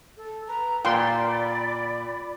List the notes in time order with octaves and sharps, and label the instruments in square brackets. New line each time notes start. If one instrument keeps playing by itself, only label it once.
[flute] A4
[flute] B4 [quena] A#5
[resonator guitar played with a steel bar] A#2 [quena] D5 [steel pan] G5 C6 [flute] B5